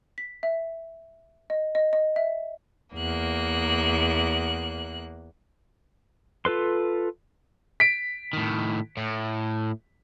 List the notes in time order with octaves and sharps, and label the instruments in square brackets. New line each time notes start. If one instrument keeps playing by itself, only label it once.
[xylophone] B6
E5
D#5
D#5
D#5
E5
[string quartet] E2 A#3 F#6
[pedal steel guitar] F4 A4 B4 C6
[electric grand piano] B6 D7
[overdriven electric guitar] A2 D#3
A2